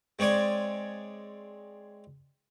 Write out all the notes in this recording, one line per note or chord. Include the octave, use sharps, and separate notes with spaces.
G#3 C4 C#5 D5 G#5